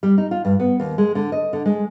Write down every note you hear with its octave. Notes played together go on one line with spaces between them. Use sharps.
G3
D#4
F4
G2
B3
D#2
G#3
D3
D#5
D3
G#3